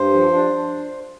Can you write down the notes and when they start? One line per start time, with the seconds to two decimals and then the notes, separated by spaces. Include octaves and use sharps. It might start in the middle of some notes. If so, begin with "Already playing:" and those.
Already playing: G2 C5
0.14 F3
0.33 D4
0.54 D4